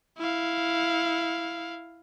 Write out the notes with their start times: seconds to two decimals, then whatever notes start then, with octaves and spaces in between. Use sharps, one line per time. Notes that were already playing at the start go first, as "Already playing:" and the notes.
0.19 E4 F5